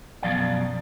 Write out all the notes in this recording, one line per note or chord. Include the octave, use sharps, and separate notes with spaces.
F#2 B2 F3 D5 F5